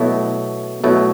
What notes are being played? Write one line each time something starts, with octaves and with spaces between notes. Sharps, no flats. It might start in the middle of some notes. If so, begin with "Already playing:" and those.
Already playing: B2 F#3 A3 E4
B2 F#3 A3 E4